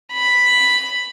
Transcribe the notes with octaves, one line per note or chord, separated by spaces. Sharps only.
B5